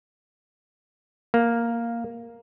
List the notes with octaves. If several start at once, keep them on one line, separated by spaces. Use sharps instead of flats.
A#3